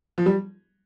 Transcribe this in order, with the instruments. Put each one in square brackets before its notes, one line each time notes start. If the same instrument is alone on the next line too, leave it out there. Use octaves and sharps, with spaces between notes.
[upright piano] F3
G3